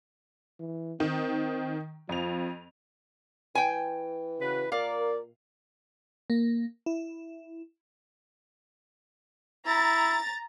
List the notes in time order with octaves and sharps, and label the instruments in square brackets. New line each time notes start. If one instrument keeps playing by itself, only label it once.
[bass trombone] E3
[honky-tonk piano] D#3 [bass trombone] C4
[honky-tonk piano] F2 F7 [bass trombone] F3
[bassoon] E3 [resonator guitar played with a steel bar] G5 G#5
[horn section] C#3 F#4 B4
[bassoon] A#2 [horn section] A#4 D5 [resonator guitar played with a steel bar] F5
[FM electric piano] A#3
E4
[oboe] E4 [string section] A#5 A6